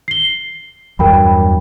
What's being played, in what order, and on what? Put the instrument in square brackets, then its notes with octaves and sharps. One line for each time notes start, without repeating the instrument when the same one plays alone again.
[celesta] C7 G7
[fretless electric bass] E2 G2 F#3 [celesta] A#4 G5 B5